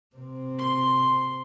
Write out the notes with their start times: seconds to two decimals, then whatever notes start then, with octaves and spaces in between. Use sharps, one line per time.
0.16 C3 C4
0.58 C6